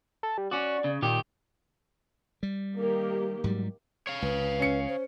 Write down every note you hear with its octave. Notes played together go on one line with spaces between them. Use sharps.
A4
G3
C#4 F#4 D5
C#3
A#2 D#3 G4
G3
D#3 A#3 G4
G#2 F#3 G3
C#5 F5
C#2 B4
C#4 C#7
C5